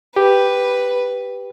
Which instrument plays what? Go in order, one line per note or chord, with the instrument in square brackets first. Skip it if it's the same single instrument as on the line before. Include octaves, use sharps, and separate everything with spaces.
[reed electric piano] G4 [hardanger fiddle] B4